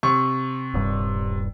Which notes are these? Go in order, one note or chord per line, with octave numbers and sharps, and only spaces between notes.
C3 C#6
D#1 G2